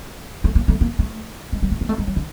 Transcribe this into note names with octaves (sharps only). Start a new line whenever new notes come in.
A3
A#3
A3
A#3
A3
G#3
G3
A3
A#3
A3
G#3
F#3
D3